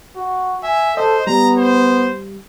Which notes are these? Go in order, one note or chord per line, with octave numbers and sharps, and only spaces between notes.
F#4
E5 G#5
A4 C5 D#5
G3 B3 A#5
C5